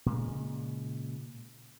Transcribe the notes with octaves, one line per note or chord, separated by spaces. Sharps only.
A#2 C#3 G#3